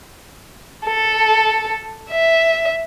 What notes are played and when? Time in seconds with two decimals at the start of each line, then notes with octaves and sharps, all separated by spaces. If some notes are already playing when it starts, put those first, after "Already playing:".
0.86 A4
2.10 E5